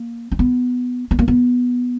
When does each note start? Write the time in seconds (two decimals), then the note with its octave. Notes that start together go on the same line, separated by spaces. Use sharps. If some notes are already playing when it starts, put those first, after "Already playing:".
Already playing: A#3
0.32 C#4
0.39 B3
1.11 B3
1.19 A#3
1.28 B3